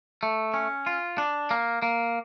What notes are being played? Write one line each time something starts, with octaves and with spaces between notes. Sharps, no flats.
A3
C#4
F4
D4
A#3
A#3